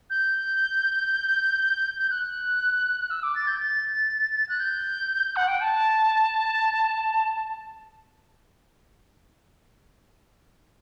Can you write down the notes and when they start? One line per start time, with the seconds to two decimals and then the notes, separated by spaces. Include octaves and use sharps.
0.10 G6
1.98 G6
2.10 F#6
3.00 F#6
3.10 E6
3.23 D6
3.35 A6
3.48 G6
3.60 A6
4.49 F#6
4.60 G6
5.36 F#5
5.48 G5
5.61 A5